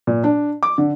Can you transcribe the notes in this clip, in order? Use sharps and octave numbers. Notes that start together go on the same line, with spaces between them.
A#2
D4
D6
D3